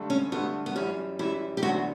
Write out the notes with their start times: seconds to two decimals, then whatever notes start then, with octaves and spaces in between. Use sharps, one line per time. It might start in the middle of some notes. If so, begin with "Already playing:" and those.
Already playing: G2 D3 A3
0.10 C#4
0.32 G2 D3 A3 B3
0.66 B3
0.75 F#2 E3 G3 C#4
1.19 F#2 E3 G3 E4
1.57 G4
1.62 D2 D3 F#3 B3 D4 F#4